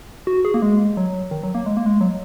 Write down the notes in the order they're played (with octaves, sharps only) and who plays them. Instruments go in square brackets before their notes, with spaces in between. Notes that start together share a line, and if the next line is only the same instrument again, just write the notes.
[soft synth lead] F#4
G#4
A#3
G#3
F#3
D#3
F#3
A#3
G#3
A#3
G#3
F#3